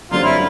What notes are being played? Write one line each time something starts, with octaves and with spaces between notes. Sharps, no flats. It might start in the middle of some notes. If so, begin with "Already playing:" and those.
F#2 D3 G3 C4 F4
E4